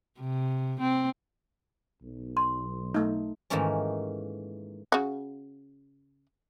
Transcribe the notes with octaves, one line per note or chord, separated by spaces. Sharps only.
C3
C4
B1
C6
A3 D#4
G#2 D#3 E3 A3 A#3 C#4
C#3 F#4